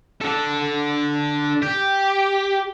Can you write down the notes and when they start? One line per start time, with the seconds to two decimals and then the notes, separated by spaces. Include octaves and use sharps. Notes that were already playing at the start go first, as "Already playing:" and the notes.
0.21 D3 A4
1.62 G4